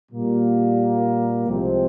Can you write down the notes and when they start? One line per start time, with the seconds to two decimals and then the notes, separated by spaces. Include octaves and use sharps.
0.12 A#2 G3 A#3
1.48 C2 C3 F3 G#3 C4